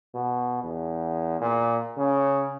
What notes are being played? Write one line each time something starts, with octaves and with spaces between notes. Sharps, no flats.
B2
E2
A#2
C#3